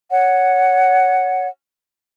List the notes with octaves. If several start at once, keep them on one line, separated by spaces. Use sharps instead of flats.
C#5 F#5